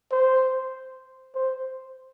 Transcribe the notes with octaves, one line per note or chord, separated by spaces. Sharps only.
C5
C5